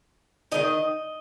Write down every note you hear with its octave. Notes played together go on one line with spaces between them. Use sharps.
D#3 A#3 D#4 D#5